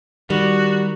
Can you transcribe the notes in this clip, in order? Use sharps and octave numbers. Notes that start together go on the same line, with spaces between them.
D#3 G3 F#4